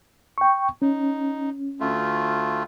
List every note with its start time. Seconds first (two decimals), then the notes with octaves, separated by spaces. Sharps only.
0.38 G5 C#6
0.82 C#4 D#4
1.80 D2 A3 F4